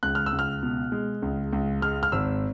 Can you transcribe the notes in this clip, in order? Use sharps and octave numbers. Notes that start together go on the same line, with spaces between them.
C#2 F#6
F6
E6
C#2
F6
B2
G#3
C#2
C#2
G#3 F6
F6
G#1 E6